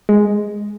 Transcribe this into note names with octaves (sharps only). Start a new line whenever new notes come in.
G#3